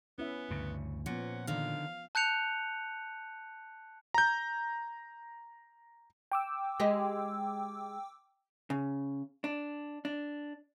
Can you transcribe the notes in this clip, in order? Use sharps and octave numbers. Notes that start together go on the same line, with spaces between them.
B3 C#4 E4 E5
D2 G2 C#3
A#2 F3 B3 C#4 F#5
D3 D#3 F5
A5 F#6 G6 C#7 F7
A#5 G6
G5 D6 E6
G#3 G4 D#5
C#3
D4
D4